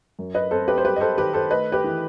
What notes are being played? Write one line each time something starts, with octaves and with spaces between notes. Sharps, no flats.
F#2
B4 D#5
C4 A4 C5
G4 B4
C5
G3 G4 B4
D#5
A4 C5
D#3 G4 B4
A4 C5
A3 B4 D#5
G4 B4
E3